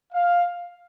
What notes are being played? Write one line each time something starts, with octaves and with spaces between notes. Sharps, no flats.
F5